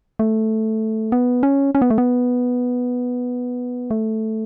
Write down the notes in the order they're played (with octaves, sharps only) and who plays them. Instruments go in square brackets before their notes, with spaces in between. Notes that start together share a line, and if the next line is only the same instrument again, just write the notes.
[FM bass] A3
B3
C#4
C#4
B3
A3
B3
A3